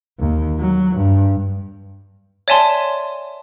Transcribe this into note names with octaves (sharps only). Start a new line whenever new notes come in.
D#2
F#3
G2
C#5 D5 E5 G#5 A5 C6